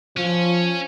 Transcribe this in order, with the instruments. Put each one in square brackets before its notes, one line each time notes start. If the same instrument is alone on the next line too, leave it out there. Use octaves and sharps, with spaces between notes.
[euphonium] F3 [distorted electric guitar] C#4